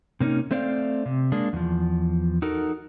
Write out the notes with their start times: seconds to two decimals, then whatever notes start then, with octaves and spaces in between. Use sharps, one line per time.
0.20 C3 A#3 C#4 D#4
0.51 A3 C4 C5 D5 D#5 F5
1.06 C3
1.32 G#3 A#3 D4
1.53 E2 F3
2.42 D#4 F#4 A4 A#4